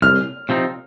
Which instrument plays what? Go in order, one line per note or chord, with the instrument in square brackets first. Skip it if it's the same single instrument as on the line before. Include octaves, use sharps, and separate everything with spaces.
[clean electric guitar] C2 [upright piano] F6
[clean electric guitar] C3 F3 C4 D#4